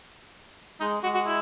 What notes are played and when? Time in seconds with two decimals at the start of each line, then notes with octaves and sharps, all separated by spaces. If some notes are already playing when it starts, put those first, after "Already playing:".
0.80 G#3 D#4
1.03 G#3 F#4
1.14 F#4
1.27 E4